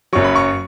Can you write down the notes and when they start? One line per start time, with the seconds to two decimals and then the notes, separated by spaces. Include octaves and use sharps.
0.13 F#1 F#2 F#3 C#6
0.24 B5
0.35 C#6